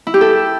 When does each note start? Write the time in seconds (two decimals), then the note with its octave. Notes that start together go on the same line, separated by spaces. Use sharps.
0.07 E4
0.14 G4
0.21 A4